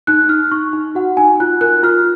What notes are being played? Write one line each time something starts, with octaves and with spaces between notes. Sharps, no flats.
D#4 F#6
D#4 F6
D#4 C#6
D#4
F#4 F#5
D#4 G#5
F4 F#6
A#4 F#6
F4 F6